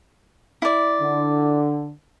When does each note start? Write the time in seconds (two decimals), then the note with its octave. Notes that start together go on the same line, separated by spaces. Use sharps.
0.62 E4 D5
1.01 D3